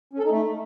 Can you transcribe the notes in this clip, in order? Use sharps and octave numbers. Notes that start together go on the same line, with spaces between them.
C#4
A4
D#4
A3